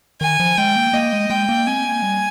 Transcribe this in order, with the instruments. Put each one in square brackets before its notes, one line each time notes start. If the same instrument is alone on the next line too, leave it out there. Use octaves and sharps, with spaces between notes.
[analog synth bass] D#3 [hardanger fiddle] G#5
[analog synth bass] F3
[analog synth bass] G#3 [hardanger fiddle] G5
[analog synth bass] A#3
[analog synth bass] A#3 [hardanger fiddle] D#5
[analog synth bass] G#3
[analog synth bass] G#3 [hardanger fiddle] G5
[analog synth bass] A#3
[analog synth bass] C4 [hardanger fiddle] G#5
[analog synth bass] A#3
G3